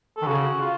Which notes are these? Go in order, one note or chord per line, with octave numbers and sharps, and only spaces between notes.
D#3 A4
C#3 F#4
F4